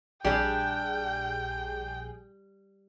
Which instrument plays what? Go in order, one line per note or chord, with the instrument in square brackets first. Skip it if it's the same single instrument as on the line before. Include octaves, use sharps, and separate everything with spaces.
[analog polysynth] A#1 G#4 [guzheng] G3 [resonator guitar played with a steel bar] D4 G4 [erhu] G5